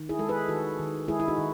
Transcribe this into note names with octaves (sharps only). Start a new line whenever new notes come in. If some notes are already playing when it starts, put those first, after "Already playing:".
Already playing: D#3
E4 G#4
G#3 A4
G#4 B4
D#3 F#4 A4
D#3
G#3 E4 G#4
E4
D#4 F#4
D#3